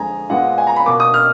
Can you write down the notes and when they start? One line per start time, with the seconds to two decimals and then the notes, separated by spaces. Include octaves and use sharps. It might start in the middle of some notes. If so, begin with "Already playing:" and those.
Already playing: F2 D3 G#3 G#5 A#5
0.30 A#2 G#3 B3 F#5
0.58 G#5
0.67 A#5
0.76 B5
0.86 B2 A#3 D6
1.00 D#6
1.14 F6